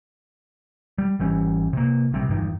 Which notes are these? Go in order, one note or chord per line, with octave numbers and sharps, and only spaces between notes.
G3
G#1 E3 G3 C#4
C3 A#3
A#1 C3 G3
G1 E2 G2 D#3